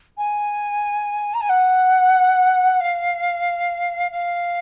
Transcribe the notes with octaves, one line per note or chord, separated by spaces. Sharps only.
G#5
A#5
G#5
F#5
F5
F5